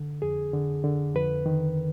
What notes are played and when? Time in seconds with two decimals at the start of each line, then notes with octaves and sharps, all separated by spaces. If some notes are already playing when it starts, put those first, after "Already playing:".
Already playing: D3
0.22 F2 G#4
0.53 D3
0.84 D3
1.15 F2 B4
1.46 D#3